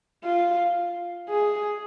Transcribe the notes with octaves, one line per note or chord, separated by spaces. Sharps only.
F4
G#4